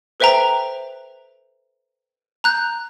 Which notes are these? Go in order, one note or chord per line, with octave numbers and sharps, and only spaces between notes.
A4 B4 C5 E5 G5 A#5
A#5 F#6 G6